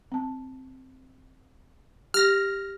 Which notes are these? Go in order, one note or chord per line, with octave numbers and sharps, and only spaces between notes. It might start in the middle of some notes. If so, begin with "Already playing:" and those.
C4 A5
G4 F6 A#6